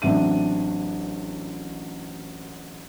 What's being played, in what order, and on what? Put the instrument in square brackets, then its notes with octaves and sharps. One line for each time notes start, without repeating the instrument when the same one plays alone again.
[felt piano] A1 F#3 C4 D4 E5 D#7